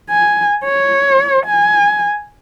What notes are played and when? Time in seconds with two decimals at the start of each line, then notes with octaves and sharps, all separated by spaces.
0.11 G#5
0.64 C#5
1.46 G#5